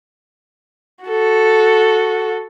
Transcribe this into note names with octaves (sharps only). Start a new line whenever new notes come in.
F#4 A4